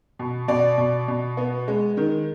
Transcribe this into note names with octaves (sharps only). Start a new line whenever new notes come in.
B2
B2 D5
B2
B2
B3
G#3
D#3